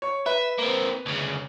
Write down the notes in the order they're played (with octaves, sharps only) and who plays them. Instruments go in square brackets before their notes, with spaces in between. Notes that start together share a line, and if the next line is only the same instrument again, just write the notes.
[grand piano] C#5 C#6
[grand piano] B4 [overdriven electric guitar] E5
[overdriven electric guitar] A#3 C4
D2 C#3